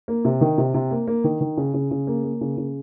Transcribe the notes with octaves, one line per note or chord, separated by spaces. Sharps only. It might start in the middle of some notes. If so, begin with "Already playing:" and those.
A#3
C3
D#3
C3
C3
A#3
A#3
D#3
D#3
C#3
C#3
C#3
A#3
A#3
C#3
C#3